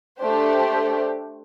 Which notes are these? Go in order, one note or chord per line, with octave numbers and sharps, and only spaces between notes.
A3 D4 G4 C5